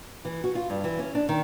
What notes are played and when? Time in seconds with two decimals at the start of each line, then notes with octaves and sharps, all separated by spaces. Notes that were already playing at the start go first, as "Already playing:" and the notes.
0.25 E3
0.44 F#4
0.55 F4
0.70 G2
0.84 E3
0.99 C#4
1.15 D4
1.29 D#3